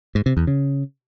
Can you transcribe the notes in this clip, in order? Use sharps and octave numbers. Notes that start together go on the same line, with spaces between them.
G#2
C3
E2
C#3